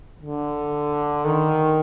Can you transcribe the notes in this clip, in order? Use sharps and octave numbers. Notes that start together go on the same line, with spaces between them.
D3
D#3